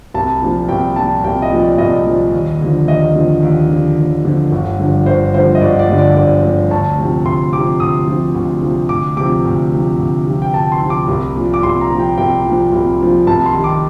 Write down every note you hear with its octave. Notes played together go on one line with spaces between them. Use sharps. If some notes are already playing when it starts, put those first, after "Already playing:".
C2 A5
A#2 F3
C2 G5
A#2 F3 A5
C2 G5
D#5
A#2 F3
D5
C2 D#5
A#2 F3
D#2
D3 F3
D#2 D#5
D3 F3
D#2
D3 F3
D#2
D3 F3
G1
G2 D3 F3
G1 C5
G2 D3 F3 C5
D#5
G1 D5
D5
G2 D3 F3
D5
G1 D5
G2 D3 F3
D2 A5
C3 F3
D2 C6
C3 F3 D6
D2 D#6
C3 F3
D2
C3 F3
D2 D6
C3 F3 D6
D2
C3 F3
D2
C3 F3
G5
D2 A5
C6
C3 F3
D6
C2
A#2 F3
D6
C2 C6
A#5
A#2 F3
G5
C2 G5
A#2 F3
C2
A#2 F3
C2 A5
C6
C3 D#3
D6